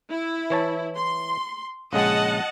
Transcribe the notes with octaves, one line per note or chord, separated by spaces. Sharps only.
E4
E3 C#5 A5
C6
A#1 C#3 G#3 D#5 F#5 A5